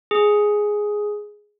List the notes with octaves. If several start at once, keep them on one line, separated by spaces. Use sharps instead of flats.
G#4